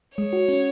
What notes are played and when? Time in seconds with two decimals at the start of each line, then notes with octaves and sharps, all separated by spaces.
0.18 G#3 C#5
0.33 F#4
0.49 C#4